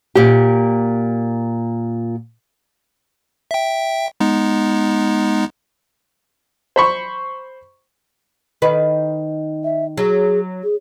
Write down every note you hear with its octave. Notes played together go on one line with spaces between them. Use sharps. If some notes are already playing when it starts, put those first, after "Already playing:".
A#2 G4
E5 G5
G#3 B3 D#4
C5 B5 C#6
D#3 B4
E5
F#3 G#4
G#4